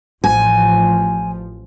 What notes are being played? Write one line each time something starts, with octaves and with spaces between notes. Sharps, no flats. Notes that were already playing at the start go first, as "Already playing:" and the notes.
A1 F3 G#5